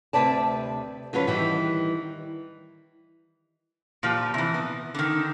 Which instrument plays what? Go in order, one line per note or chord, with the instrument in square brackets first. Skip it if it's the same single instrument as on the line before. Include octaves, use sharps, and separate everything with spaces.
[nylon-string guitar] D2 C3 B4 D5 A5
D3 F#3 C#4 F4 B4
D#3 E3 G3
[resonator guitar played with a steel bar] A#2 F3 G4
C3 E3
B3
D3 D#3